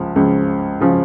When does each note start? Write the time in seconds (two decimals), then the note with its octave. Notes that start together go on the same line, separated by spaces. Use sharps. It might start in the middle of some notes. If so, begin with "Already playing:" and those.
Already playing: C#2 C#3 F3
0.16 C#2 C#3 F3 C#4
0.81 C#3 F3 C#4